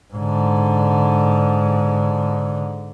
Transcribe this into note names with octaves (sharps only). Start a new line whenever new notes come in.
G#2 D3